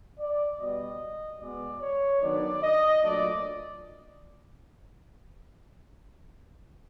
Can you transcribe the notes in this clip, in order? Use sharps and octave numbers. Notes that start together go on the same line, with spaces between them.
D5
B2 G3 B3 D#5
B2 G#3 B3 D5
C#5
D#3 F#3 B3 D4 D5
D#5
A#2 F#3 A3 D4 D5